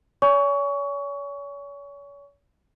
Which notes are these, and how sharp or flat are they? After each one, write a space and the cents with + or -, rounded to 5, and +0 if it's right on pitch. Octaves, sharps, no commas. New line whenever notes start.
C#5 +40 G#5 +0 C#6 +20